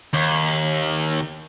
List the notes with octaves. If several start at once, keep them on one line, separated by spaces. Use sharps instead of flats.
D#2